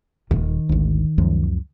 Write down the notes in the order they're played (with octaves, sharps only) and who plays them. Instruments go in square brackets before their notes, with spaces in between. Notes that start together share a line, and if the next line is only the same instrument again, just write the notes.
[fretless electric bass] D#1 [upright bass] D#3
[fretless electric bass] G#1 D2
C#2 F#2 F3